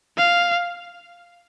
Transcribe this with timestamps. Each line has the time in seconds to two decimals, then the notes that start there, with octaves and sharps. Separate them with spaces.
0.17 F5